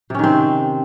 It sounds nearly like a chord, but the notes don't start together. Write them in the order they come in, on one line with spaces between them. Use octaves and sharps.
C3 C#4 D#3 C4